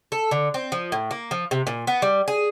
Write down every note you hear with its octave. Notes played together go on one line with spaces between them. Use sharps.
A4
D3
C4
F3
A2
A#3
F3
C3
A#2
B3
G3
G#4